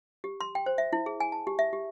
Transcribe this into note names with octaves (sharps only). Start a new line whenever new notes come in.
G4
C6
G5
C5
E5
E4
G#4
G#5
A5
G4
E5
G4